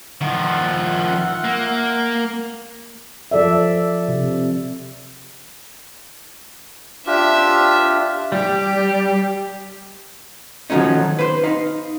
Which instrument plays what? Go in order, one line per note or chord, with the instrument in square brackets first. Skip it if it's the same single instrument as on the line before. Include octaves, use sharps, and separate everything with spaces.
[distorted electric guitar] D#3 F3 [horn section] F4 E5 F#5
[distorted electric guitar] A#3
[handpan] F3 A4 D5 E5
C3
[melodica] D4 F4 G4 [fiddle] E5
[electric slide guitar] G3 [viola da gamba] G4
[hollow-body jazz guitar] D#3 F3 F#3 A3 C#4 D#4
B4 C5
D#4 F5